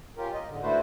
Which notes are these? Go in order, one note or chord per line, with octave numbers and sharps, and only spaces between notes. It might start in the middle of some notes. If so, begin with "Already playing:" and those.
C#4 F4 G4 A#4
D#5
G#2 D3
A3 D4 E4 F#4 B4 C5